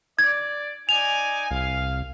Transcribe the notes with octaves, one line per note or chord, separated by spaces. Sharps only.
D5 G#6
D#4 D5 G#5 F7
C2 F5